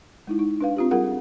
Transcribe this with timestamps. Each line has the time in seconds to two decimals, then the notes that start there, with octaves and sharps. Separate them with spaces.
0.27 G#3 D#4 E4
0.39 D#4
0.61 D4 B4 F5
0.76 C4 F4 G4
0.91 G3 F4 G#4 A#4 F#5